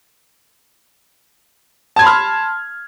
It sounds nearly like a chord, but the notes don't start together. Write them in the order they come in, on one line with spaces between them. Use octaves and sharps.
A5 G#6 C6 B5 F6